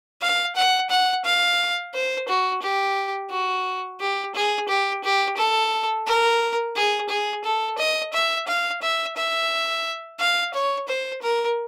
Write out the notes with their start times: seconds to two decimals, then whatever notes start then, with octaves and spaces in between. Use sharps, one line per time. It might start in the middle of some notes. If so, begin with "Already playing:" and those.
0.21 F5
0.56 F#5
0.90 F#5
1.24 F5
1.93 C5
2.28 F#4
2.62 G4
3.30 F#4
4.00 G4
4.35 G#4
4.68 G4
5.04 G4
5.37 A4
6.06 A#4
6.75 G#4
7.09 G#4
7.44 A4
7.78 D#5
8.13 E5
8.47 F5
8.82 E5
9.17 E5
10.19 F5
10.54 C#5
10.88 C5
11.22 A#4